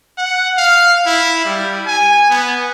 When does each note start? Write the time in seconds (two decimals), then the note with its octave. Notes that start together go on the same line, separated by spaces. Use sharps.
0.18 F#5
0.57 F5
1.06 E4
1.45 G3
1.86 G#5
2.30 B3